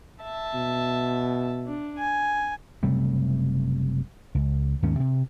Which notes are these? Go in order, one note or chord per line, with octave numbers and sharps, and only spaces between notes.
E5 A5
B2
D4
G#5
F#1 C3 G3 A3
C#2
D#2 G#2 D#3 C#4
C3